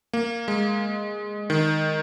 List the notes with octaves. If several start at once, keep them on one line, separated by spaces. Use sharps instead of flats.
A#3
G#3
D#3